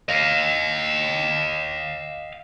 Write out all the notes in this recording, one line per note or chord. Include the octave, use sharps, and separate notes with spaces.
D#5 F5